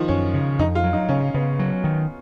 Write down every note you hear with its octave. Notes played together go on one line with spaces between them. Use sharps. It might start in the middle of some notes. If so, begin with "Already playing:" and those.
Already playing: D#3 F3
F#2 C#4
C#3
F2 D#4
F4
F#3
D#4
C#3 C#4
C#3 B3
F#3
D#3